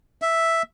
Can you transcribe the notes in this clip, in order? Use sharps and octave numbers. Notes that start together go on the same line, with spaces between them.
E5